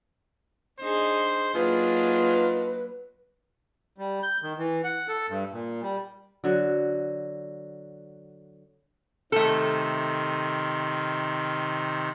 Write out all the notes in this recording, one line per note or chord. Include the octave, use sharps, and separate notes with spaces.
D4 D#4 G#4 C5
F#3 A#3 D4 D#4 F4 G#4 B4
G3
G6
D#3
E3
F#5
A4
G2
A#2
G3
D3 F#3
C3 D#3 A3 A4